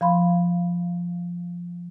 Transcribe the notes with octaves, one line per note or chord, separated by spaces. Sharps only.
F3 F5 B5 C6